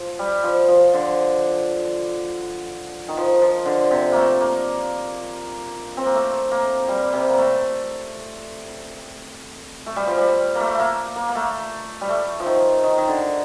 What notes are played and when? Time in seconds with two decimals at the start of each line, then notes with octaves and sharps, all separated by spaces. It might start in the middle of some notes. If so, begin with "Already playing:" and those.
Already playing: F3
0.19 G3
0.44 F3
0.68 F3
0.94 D3
3.08 D#3
3.17 F3
3.42 F3
3.66 D3
3.91 C3
4.12 A3 A#3
4.40 A#3
5.97 C4
6.06 A#3
6.14 A3
6.51 A#3
6.88 G3
7.13 C3
7.30 A#3
7.38 A3
9.86 A3
9.96 G3
10.07 F3
10.18 G3
10.55 A#3
10.60 A3
10.75 A3 A#3
11.16 A#3
11.29 A#3
11.35 A3
12.01 G3
12.09 A3
12.40 F3
12.46 D#3
12.84 D#3
12.98 D#3
13.08 D3